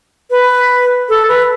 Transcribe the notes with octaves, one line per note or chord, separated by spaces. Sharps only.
B4
A4
B4